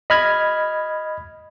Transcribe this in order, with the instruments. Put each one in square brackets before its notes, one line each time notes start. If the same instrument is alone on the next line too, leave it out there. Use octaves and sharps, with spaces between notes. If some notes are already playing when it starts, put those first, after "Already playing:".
[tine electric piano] D#5 B5 F6 G#6